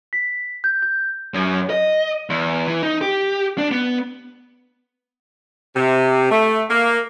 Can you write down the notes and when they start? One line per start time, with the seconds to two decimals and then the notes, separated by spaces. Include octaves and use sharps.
0.13 B6
0.64 G6
0.82 G6
1.34 F#2
1.70 D#5
2.30 E2
2.67 E3
2.82 D#4
3.01 G4
3.58 D4
3.71 B3
5.76 C3
6.31 A3
6.70 A#3